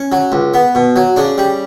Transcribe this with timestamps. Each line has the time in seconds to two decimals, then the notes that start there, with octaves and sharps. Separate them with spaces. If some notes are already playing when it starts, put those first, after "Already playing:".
Already playing: C#4
0.12 F#3
0.32 C#2
0.54 B3
0.75 B2
0.96 F#3
1.16 C#3 D4
1.38 G3